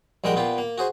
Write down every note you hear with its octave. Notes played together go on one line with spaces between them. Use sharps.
A#1 G3 G#3 A#4 F#5 G5
A#2 B3 F4 G4
A#3
F#4 G#4 C5